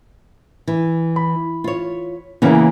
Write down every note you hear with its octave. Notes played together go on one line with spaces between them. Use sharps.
E3
B5
F4 C#5
C#3 E3 A#3 B3 C#4 E4